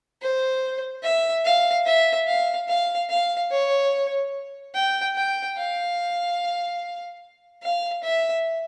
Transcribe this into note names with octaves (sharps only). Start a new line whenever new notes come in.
C5
E5
F5
E5
F5
F5
F5
C#5
G5
G5
F5
F5
E5